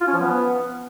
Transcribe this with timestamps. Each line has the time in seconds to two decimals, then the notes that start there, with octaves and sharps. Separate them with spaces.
0.01 F4
0.07 C#4
0.14 F3
0.20 B3